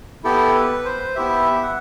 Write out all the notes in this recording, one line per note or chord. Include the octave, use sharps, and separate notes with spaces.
B3 E4 G4 A4
B4
C5
B3 E4 G4 E5
F#5